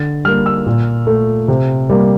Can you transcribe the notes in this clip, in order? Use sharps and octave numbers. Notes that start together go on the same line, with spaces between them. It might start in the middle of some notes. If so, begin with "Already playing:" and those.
Already playing: D3 A6
G3 A#3 F6
E6
A#2
A3
C3
G3 A#3